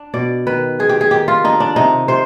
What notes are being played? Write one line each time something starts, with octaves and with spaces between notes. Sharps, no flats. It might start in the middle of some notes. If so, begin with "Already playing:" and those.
Already playing: D4
B2 D5
D#3 B4
G#3 G#4
G4
G#4
D#3 G4
F4
D4 D#4
D4
C3 D#4
C3 C5